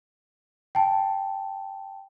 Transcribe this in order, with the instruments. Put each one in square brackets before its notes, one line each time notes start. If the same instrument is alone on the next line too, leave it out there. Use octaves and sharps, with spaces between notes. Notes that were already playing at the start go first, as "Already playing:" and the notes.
[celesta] G5 A5